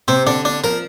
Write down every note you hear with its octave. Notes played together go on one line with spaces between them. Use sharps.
C3 C4
D3 D4
D4
F3 A#4